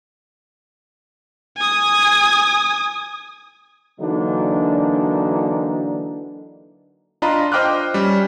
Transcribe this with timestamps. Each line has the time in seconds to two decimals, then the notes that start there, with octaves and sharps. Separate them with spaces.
1.58 G#5 D#6
4.00 D3 E3 F#3 A#3 D4 D#4
7.22 D4 F4 D#5 A#5 B5
7.52 C5 D#5 G5 D6 F6 F#6
7.94 G3 C#4